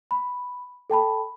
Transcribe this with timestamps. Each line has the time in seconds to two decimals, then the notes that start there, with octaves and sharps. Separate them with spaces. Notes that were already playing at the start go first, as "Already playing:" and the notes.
0.11 B5
0.90 A4 G5 A5 B5